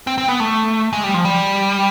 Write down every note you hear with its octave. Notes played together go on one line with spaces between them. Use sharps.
C4
C4
B3
A3
G#3
G3
F3
G3